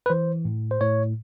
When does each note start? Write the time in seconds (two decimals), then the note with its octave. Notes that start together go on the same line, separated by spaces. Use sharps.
0.06 B4
0.10 E3 C5
0.45 A2
0.71 C5
0.81 A2 C#5